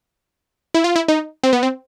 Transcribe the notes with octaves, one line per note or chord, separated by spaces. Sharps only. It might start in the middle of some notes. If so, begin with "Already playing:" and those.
E4
F4
E4
D#4
C4
B3
C4